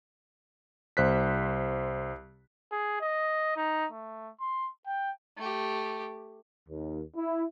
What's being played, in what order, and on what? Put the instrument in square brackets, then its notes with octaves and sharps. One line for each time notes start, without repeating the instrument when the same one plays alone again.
[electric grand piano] C2 C5 F#6 B6
[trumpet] G#4
D#5
D#4
A3
C6
G5
[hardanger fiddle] A3 G4
[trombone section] D#2
E4